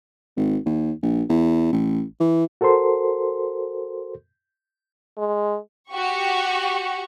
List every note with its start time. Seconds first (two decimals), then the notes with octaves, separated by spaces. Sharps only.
0.36 G#1
0.66 D#2
1.03 A#1
1.29 E2
1.72 A1
2.20 E3
2.61 F#4 A4 A#4 C5 C6
5.18 G#3
5.92 F#4 G4 C#6